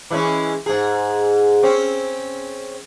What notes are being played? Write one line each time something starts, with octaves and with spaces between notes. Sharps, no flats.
E3 G#3 C#4
G#2 G#4
C4 C#4